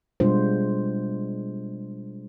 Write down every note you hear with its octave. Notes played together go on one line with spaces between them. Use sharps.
B2 G3 G#3 D4 F4 C5